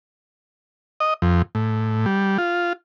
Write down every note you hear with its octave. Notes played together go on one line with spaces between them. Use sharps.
D#5
F2
A2
G3
F4